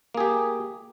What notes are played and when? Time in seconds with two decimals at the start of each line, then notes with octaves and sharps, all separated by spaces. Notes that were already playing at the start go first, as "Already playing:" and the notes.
0.14 A#3
0.17 G#4
0.20 G4